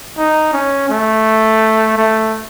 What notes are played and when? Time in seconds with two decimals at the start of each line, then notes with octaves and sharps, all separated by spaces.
0.18 D#4
0.53 C#4
0.89 A3
1.97 A3